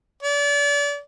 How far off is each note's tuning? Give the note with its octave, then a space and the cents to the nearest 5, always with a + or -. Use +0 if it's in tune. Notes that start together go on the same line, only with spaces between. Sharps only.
D5 -35